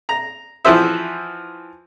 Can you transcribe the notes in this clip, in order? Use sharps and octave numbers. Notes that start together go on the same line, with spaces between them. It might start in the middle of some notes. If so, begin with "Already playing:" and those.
A#5
E3 F3 F#4 C5 E5